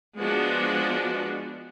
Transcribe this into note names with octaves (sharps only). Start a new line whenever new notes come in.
F3 G#3 B3 D4 F#4